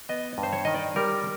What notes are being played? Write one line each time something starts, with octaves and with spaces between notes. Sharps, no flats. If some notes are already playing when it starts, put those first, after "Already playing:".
B3 D#5
G2
C5
C#5
D#3 D#5
D5
G3 A#4